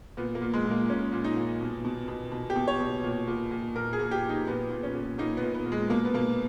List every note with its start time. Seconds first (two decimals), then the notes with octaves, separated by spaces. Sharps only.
0.17 A#2 B3
0.35 A#3
0.42 A#2
0.54 G#3
0.65 A#2
0.71 A#3
0.90 A#2 C#4
1.13 A#2
1.24 D#4
1.37 A#2
1.61 B2
1.85 B2
2.08 B2
2.32 B2
2.50 G4
2.56 B2
2.68 C#5
2.80 B2
3.04 A#2
3.28 A#2
3.51 A#2
3.75 A#2 A#4
3.93 G#4
3.99 A#2
4.11 G4
4.23 A#2
4.29 D#4
4.47 A#2 B3
4.71 A#2
4.83 C#4
4.95 A#2
5.18 A#2 D#4
5.37 B3
5.43 A#2
5.54 B3
5.66 A#2
5.72 G#3
5.90 B2 A#3
6.05 B3
6.14 B2 A#3